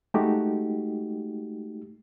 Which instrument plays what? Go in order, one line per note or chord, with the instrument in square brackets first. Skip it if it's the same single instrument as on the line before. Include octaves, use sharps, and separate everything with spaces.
[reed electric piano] G#3 A3 D#4 F#4 G4